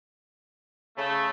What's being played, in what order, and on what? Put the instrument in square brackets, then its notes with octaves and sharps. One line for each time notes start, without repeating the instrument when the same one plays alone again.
[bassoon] C#3 [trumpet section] A3